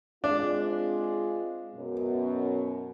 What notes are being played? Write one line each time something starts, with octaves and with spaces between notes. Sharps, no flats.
G#3 C4 D4 F4
F#2 B2